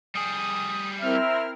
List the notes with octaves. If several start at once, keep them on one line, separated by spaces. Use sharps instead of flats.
G3 G#4 D#6
C4 E4 A#4 E5 F6